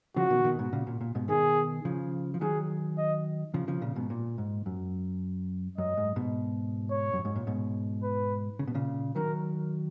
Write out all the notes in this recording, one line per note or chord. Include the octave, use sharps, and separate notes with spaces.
C#3 F3 F#4
B2 D#3
B2 D#3
G#2 B2
A#2 C#3
A#2
A#2
G#2 B2
B2 D#3 G#4
C#3 F3
F3
D#3 F#3 G#4
D#5
C#3 F3
C#3 F3
A#2 C#3
G#2 B2
A#2
G#2
F#2
F#2 D#5
G#2
G#2 B2
C#5
F#2
G#2
A#2
G#2 B2
B4
C#3
B2
A#2 C#3
D#3 F#3 A#4